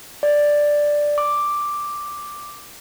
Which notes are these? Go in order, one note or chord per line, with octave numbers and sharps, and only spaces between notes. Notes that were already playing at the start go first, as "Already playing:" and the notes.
D5
D6